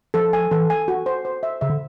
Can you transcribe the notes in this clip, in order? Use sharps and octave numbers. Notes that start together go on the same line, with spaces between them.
F3 A4
G#5
E3 A4
G#5
F#4
C5
C5
E5
C#3 E5
D3